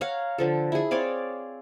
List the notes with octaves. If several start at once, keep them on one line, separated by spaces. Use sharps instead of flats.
C#5 F5 F#5 A#5
D3 F3 A4
E4 G#4
C4 C#5 D5 F5